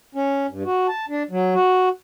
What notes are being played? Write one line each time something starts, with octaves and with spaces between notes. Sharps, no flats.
C#4
G2
F#4
A5
D4
F#3
F#4